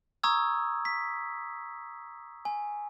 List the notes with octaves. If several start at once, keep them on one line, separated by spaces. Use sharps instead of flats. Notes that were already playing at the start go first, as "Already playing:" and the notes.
A#5 C#6 D#6 E6 G#6
B6
G#5